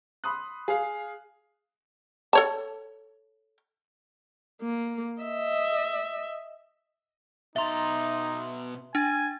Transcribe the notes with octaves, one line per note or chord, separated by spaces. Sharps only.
B5 C6 D#6 F#6
G#4 F5
A4 C#5 A5
A#3
D#5 E5
B2 D#4 E5 A#5 C6
D4 G#5 A6